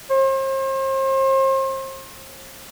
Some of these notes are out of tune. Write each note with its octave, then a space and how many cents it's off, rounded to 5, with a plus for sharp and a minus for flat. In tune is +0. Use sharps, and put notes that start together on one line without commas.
C5 +40